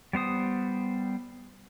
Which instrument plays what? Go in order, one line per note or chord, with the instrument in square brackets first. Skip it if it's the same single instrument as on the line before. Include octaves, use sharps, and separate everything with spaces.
[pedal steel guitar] G3 B3 C5 D#6